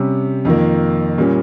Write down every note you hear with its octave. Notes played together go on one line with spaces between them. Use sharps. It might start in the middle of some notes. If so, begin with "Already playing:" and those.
Already playing: C3 G3 C#4
F2 D#3 A#3
A#2 G3 A#3 C#4